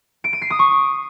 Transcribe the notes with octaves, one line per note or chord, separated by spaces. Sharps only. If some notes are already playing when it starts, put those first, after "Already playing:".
D7
D#7
C7
D#6
C#6